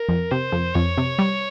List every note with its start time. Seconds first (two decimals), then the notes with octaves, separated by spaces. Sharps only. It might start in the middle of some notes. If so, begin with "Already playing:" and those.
Already playing: A#4
0.09 F2
0.31 C3 C5
0.52 F2
0.74 F2 C#5
0.98 C3
1.19 G3